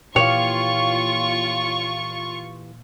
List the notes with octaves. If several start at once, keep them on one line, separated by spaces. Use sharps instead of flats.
A#2 E3 F4 G4 C#5 F5 C#6